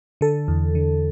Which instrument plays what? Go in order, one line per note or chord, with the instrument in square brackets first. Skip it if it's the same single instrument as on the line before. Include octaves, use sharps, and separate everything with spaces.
[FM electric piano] D3 A4
E2
D3